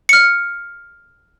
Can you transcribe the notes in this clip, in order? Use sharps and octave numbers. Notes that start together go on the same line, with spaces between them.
F6 C#7